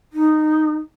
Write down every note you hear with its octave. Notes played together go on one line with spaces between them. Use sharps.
D#4